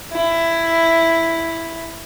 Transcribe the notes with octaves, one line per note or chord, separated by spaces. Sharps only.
E4